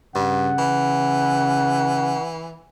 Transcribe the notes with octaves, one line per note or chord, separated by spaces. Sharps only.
G2 C#3 F#5
E3